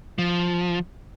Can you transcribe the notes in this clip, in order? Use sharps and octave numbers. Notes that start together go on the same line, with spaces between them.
F3